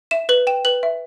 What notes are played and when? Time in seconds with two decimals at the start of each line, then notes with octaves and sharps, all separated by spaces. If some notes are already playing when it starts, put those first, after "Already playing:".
0.11 E5 E7
0.29 B4 F#7
0.47 G5 E7
0.65 B4 F#7
0.83 E5